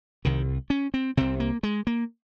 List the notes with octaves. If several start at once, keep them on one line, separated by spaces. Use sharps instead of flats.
C2 C3 D#3
C#4
C4
C2 C3 C4
A#3
G#3
A#3